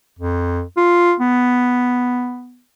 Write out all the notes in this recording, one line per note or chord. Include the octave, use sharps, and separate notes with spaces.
F2
F4
B3